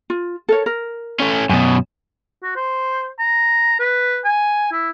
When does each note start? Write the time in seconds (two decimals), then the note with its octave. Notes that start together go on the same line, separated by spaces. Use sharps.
0.10 F4
0.49 A4 A#4 C#5
0.66 A#4
1.20 A3 C#4
1.49 F#2 B2 G#5
2.43 F#4
2.56 C5
3.19 A#5
3.80 B4
4.25 G#5
4.72 E4